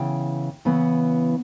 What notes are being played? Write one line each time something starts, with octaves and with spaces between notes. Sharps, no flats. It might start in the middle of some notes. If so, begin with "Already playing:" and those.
Already playing: C#3 E3 B3 E4 G5
C#3 E3 B3 E4